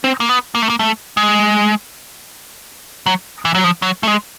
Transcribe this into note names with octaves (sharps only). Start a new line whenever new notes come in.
C4
A#3
B3
A#3
A3
A#3
A3
G#3
F#3
E3
F#3
F3
F#3
A3
G#3